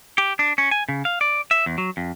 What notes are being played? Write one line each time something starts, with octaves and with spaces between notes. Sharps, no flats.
G4
D4
C#4
G#5
C#3
F5
D5
E5
E2
F#3
F2